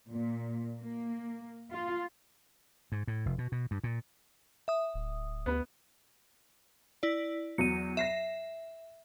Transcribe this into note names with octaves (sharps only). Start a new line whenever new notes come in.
A#2
A#3
F4
G#2
A2
F1
B2
B2
G2
A#2
E5 D#6
D1
D2 B3 B4
E4 D5
E2 F#3 C#7 D#7
E5 A#6 C7 E7